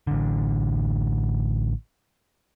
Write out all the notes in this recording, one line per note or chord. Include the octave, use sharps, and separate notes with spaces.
A1 D3